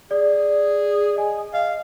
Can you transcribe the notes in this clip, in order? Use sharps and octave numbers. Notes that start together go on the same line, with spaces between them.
G#4 D5
D#5 G#5
D#5 F5